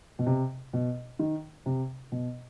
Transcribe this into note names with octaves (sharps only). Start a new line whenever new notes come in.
B2
C3
B2
D#3
C3
B2